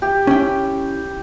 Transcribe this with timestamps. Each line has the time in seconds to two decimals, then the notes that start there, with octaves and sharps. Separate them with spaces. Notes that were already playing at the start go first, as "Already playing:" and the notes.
0.02 G4
0.27 C#4 E4 G5